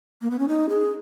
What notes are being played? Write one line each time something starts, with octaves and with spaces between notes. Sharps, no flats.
A#3
B3
C#4
D#4
G#4